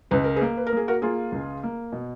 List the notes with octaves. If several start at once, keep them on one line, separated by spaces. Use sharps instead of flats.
C#2 B4
A#4
G#4 B4
A#3
B4
A#4
A#3 G#4
F#4 A#4
A#3 F4 G#4
C#2
A#3
B2